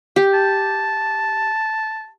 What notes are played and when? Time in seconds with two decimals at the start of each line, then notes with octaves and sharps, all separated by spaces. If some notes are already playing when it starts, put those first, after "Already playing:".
0.16 G4
0.34 A5